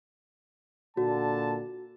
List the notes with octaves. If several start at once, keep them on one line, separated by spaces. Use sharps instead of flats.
A#2 D3 F#4 A5